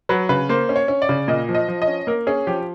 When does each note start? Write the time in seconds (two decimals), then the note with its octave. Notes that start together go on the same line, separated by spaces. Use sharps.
0.09 F#3 B4
0.29 C#3 B4
0.49 A#3 C5
0.69 C#4
0.76 C#5
0.88 C#4
1.02 D5
1.09 C#3
1.28 A#2 D#5
1.49 F3
1.55 D#5
1.68 F3
1.82 D#5
1.87 C#4
2.07 A#3 A#4
2.27 C#4 G#4
2.47 F3 G4